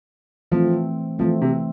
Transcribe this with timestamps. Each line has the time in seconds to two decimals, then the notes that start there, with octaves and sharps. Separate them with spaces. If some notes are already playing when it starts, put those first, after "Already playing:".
0.52 E3 F3 A3 C4
1.19 E3 F3 A3 C4
1.42 C3